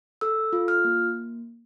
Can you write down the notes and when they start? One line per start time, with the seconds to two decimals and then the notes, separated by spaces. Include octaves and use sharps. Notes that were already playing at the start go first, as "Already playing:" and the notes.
0.21 A4 E6
0.53 F4
0.68 F6
0.84 A#3